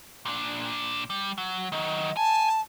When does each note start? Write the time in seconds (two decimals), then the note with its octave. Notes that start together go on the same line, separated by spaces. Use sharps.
0.25 A#2 D4
1.10 G3
1.38 F#3
1.72 D#3 F#3 D#5
2.17 G#5 A5